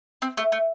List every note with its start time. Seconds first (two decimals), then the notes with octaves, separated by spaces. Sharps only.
0.22 C4
0.37 A3
0.52 A3